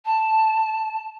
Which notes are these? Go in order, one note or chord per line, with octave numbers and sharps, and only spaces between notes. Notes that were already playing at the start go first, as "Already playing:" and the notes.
A5